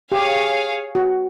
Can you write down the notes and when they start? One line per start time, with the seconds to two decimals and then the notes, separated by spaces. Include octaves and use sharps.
0.12 G4 G#4 C#5 F5
0.95 F#4